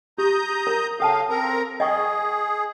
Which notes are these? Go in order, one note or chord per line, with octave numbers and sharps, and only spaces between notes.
G4 A#5 D#6 G6
A#4
C#3 A4 F5 G5 A5
C4 A#4 A#5
G#4 D#5 G5 C#6